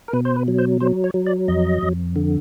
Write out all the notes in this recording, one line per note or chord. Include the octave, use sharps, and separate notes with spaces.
A#4
B2 B4
C5
B4
F#3
C5
F#3 C5
C#5
F#3
D5
F2 D#5
F2
D3